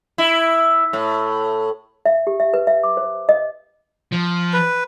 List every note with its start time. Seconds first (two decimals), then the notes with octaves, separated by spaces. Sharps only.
0.18 E4
0.93 A2
2.06 E5
2.27 G4
2.40 E5
2.54 B4
2.67 E5
2.83 D6
2.97 C5
3.29 D#5
4.12 F3
4.53 B4